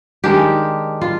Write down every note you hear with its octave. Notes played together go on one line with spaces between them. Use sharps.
D#3 G#3 D4 G4
F4